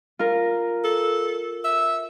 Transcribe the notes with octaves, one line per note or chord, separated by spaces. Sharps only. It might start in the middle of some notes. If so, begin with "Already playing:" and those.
F4 A#4
A4
E5